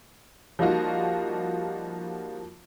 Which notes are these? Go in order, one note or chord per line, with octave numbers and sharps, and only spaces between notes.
F3 G3 A#3 D#4 F4 F#4